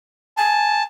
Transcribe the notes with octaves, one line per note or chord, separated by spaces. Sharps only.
G#5 A5